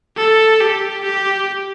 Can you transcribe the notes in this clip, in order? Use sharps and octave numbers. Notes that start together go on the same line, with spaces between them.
A4
G4
G4